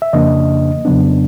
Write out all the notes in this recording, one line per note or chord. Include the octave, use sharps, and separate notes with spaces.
E5
F2 C#3 F3 A#3 D4 D#5
F2 C#3 F#3 B3 D4